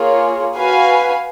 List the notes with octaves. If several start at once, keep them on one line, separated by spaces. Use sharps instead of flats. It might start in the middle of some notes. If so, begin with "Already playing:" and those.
Already playing: A#3 F4 G#4 C#5
F#4 B4 F5 G#5